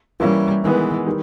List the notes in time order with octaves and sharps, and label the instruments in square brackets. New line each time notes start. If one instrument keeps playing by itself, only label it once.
[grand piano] E3 A#3 C#4 E4 [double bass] G3
[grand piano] D#3 G#3 B3 [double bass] E3
[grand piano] D#3 G3